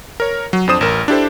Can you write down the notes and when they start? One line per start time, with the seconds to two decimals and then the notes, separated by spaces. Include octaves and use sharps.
0.20 A#4 C#5
0.53 F#3
0.68 F2 D4 C5 D#6 E7
0.81 A1 A#4
1.08 D4 E4 G4 A4 C5